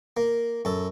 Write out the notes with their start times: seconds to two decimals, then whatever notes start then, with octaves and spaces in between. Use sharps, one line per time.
0.17 A#3
0.65 F#2 A4